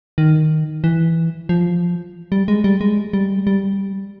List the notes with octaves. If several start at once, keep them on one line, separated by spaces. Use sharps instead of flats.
D#3
E3
F3
G3
G#3
G3
G#3
G3
G3